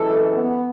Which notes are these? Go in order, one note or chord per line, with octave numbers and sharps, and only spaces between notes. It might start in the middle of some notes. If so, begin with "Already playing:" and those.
Already playing: F#2 E3 G#3 A4
B3